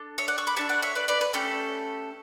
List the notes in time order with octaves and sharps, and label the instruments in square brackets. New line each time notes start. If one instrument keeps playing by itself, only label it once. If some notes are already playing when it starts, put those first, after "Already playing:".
Already playing: [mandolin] D4 A4
C#5 E5
D5 F#5
C#6 E6
B5 D6
A3 D4 G4 A5 C#6
D5 F#5
C#5 E5
B4 D5
B4 D5
B4
A3 C#4 G4 A4